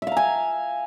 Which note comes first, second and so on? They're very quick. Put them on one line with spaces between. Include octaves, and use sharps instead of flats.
E5 F5 A#5 G#5